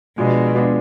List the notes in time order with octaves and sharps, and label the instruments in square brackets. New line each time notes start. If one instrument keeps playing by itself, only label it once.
[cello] B2 [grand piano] F3 G#3 B3 D4 G#4
[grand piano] F3 G#3 B3 D4 G#4